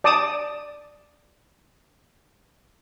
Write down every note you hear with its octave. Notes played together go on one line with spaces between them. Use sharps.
D5 A5 D6 D#6